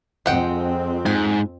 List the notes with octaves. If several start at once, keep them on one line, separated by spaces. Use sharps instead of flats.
F2 G#3 C4 F#5 G5
G#2 G#5